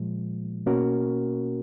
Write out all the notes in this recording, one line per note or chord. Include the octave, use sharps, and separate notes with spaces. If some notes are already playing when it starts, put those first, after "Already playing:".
Already playing: A#2 F3 G#3
B2 A#3 C#4 F#4 A#4